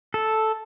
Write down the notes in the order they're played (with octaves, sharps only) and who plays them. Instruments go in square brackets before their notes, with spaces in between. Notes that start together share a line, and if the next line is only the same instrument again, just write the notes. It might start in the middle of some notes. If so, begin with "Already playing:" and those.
[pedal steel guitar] A4